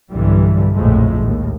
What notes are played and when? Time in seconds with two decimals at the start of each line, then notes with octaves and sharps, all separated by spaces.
0.11 B1 G2 D3 E3 G3
0.75 A#1 F2 A2 G#3 A3
1.21 D#2 A2